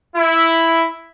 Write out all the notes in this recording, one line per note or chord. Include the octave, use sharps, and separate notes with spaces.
E4